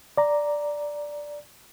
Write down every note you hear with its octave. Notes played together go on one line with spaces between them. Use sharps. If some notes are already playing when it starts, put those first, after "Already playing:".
D5 A#5